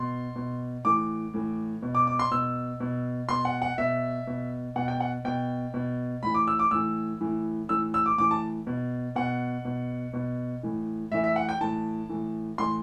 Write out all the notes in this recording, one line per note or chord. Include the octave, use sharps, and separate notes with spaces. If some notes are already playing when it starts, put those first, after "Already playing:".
Already playing: B2 C6
B2
A2 E3 D6
A2 E3
B2
D6
D6
C6
B2 E6
B2
B2 C6
F#5
F#5
B2 E5
B2
B2 F#5
G5
F#5
B2 G5
B2
A2 E3 B5
D6
E6
D6
A2 E3 E6
A2 E3
A2 E3 E6
E6
D6
A2 E3 D6
A5
B2
B2 F#5
B2
B2
A2 E3
A2 E3 E5
E5
F#5
G5
A2 E3 A5
A2 E3
A2 E3 C6